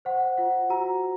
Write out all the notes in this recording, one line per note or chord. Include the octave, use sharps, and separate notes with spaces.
C5 F#5
F4 F#5
F#4 A#5